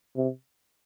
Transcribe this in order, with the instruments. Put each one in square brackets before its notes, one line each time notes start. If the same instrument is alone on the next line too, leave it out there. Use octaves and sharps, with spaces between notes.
[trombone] C3